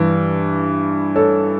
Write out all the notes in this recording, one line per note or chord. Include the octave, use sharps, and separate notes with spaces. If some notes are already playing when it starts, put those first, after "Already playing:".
Already playing: G2 E3
A4 C#5